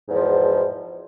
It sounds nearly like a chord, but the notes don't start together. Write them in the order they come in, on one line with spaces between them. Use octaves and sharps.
G#2 E2 F3 B2